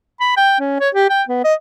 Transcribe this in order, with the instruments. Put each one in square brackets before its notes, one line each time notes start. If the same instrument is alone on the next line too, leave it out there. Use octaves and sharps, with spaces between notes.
[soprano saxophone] B5
G5
C#4
C#5
G4
G5
B3
D#5